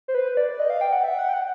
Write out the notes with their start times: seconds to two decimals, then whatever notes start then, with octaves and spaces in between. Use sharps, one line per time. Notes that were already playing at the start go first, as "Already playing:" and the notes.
0.08 C5
0.15 B4
0.37 D5
0.59 D#5
0.70 F5
0.81 G5
0.92 F#5
1.04 E5
1.19 F#5
1.29 G5
1.34 F#5